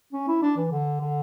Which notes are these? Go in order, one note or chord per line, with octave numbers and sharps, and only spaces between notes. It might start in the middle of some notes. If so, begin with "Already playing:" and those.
C#4
E4
D4
E3
D3
D3